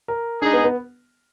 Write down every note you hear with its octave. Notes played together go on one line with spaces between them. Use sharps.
A#4
G#3 D4 D#4 G#4
B3
B3